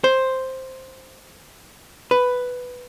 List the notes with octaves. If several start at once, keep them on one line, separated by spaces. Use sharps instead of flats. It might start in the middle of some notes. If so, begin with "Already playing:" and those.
C5
B4